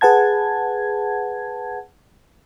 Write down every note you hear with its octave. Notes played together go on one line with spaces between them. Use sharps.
G#4 B4 F#5 A5 G#6